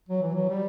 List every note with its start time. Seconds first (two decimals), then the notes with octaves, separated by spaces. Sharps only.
0.09 F#3
0.22 E3
0.34 F#3
0.50 G3